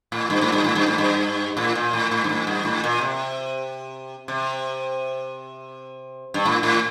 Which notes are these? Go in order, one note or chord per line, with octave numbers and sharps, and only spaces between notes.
A2
G2
A2
G2
A2
G2
A2
G2
A2
A#2
A2
A2
G2
A2
G2
A2
A#2
C3
C3
G2
A2
A2